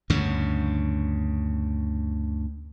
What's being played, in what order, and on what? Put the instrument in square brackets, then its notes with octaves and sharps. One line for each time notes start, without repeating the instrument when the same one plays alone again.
[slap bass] D2 G2 C#3